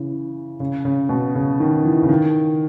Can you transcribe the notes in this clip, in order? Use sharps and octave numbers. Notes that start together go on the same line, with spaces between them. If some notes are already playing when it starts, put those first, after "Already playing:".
Already playing: C#3 E3
C#3
C#3
B2
C#3
D#3
E3
C#3
D#3